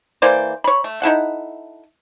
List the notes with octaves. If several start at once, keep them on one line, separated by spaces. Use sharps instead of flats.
E3 A#3 C5 D5
C#5 B5
A3
D#4 E4 A4 F#5